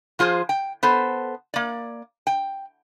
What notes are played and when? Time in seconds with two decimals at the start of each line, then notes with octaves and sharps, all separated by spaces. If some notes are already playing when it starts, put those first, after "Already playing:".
0.19 F3 F4 G#4 C5
0.49 G5
0.83 B3 A4 C5
1.54 A#3 D5
2.27 G5